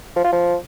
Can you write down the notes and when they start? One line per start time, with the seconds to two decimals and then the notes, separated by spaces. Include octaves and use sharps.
0.16 F3
0.24 F4
0.32 F3